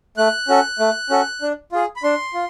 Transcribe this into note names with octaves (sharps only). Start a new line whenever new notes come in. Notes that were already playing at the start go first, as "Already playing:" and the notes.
A3 F#6
C#4 F#4 A4
A3
C#4 F#4 A4
D4
F4 G#4
B5
D4 C6
F4